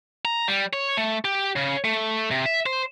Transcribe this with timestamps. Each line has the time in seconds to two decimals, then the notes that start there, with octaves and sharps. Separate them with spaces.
0.25 A#5
0.48 G3
0.73 C#5
0.97 A3
1.25 G4
1.56 C#3
1.84 A3
2.31 C3
2.46 E5
2.66 C5